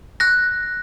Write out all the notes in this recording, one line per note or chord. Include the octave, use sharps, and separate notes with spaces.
F#6 A#6